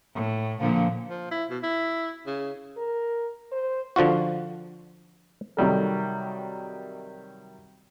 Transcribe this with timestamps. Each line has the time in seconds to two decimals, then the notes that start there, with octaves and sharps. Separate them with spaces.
0.14 A2
0.60 A#2 D3 F3
1.10 F3
1.31 E4
1.50 B2
1.63 E4
2.27 C#3
2.77 A#4
3.52 C5
3.96 D3 F3 F4 F#4
5.57 C3 D#3 F#3 G3 A4 A#4